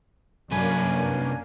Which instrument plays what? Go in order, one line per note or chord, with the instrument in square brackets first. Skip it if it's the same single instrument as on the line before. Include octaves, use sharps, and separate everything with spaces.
[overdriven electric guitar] C2 B4 [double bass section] F#2 [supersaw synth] A#3 C#4 D4 [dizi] G#5